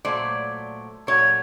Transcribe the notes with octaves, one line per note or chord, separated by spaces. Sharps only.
A#2 F#3 A3 C5 D5
A#2 F#3 A3 C#5